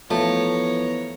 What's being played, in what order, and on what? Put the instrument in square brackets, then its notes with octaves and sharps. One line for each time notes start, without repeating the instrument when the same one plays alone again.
[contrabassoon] E2 [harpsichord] F3 [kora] A3 [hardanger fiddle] C#5 A#5